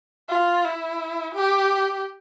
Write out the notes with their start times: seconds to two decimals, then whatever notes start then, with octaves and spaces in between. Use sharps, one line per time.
0.29 F4
0.64 E4
1.35 G4